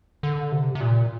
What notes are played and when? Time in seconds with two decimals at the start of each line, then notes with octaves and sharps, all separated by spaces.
0.23 D3
0.52 C3
0.75 C3
0.80 A#2